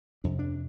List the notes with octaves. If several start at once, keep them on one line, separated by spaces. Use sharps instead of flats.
F2 C3 D4
D4